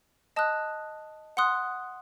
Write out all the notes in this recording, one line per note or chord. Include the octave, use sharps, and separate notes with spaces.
D#5 A5 D#6 F#6
F#5 C6 D#6 F#6